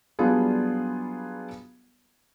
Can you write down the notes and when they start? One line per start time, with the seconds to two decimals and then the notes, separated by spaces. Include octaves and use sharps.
0.19 F#3 G3 B3 D4 F4 G#4